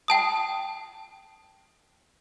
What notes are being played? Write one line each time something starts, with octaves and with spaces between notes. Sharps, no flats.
G5 A5 D#6